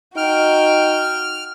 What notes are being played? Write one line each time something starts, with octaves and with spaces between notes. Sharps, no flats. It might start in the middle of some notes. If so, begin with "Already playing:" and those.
D#4 F#4 G5 F6